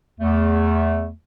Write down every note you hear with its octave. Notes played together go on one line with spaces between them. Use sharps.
E2 A3